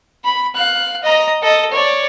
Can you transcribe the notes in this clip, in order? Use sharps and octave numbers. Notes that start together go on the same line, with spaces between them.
B5
F5 F#6
D#5 A#5
A4 D#5
C#5 D5